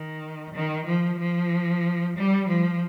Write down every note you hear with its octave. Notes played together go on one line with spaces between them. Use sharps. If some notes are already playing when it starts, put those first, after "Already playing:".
Already playing: D#3
D#3
F3
F3
G3
F3